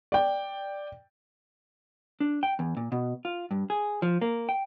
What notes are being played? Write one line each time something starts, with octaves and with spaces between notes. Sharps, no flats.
D5 G5
D4
G5
E2
A#2
B2
F4
G2
G#4
F3
A#3
G5